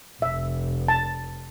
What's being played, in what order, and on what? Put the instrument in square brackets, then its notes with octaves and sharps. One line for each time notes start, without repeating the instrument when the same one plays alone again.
[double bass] F1 [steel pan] E5
[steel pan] A5